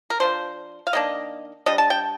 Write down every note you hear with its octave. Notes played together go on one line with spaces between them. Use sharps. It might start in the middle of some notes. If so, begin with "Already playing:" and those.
A#4
F3 A3 D4 C5
F5
D#3 A#3 D4 D#5
G3 D4 D#5
A5
G5